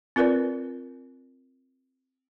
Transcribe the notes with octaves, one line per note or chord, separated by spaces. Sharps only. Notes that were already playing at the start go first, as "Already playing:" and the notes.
C4 F4 A#4 B4 D5